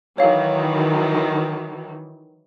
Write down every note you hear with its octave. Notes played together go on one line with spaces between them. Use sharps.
D#3 E3 F#3 C#5 F5